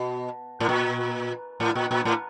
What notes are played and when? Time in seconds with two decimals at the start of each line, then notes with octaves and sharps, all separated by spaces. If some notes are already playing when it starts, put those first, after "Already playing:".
Already playing: B2
0.60 A2
0.69 A#2
1.60 A2
1.75 A#2
1.91 A#2
2.05 A2